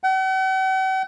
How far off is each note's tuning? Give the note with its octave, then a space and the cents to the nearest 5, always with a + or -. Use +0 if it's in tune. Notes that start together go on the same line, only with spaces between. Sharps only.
F#5 +45